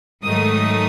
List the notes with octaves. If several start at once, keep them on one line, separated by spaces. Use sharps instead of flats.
G#2 D#3 F#3 A3 D#4 D#6